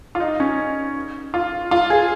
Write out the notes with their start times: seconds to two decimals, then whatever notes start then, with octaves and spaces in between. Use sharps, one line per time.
0.15 F4
0.20 D#4
0.40 C#4
1.34 F4
1.71 F4
1.90 G#4